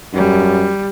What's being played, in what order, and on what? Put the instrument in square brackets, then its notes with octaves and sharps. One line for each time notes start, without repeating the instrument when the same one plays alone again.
[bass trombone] F#2 [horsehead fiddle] G3